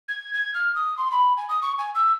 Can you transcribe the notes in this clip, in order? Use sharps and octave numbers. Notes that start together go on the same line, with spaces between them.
G#6
G#6
F6
D#6
C6
B5
G#5
D#6
C#6
G#5
E6